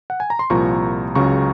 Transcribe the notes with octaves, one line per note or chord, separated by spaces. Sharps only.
F#5
G#5
A#5
C6
C2 A#2 F3 A#5 C#6
C#2 C#3 F#3 A#5 C#6